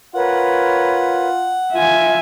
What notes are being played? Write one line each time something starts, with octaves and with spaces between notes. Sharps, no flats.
F4 A#4 B4 C#5 F#5
F4 E5 G#5